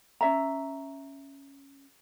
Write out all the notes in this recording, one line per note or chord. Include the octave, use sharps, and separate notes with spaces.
C#4 E5 A#5